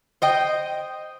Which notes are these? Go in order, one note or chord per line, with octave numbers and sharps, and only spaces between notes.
C5 D#5 G5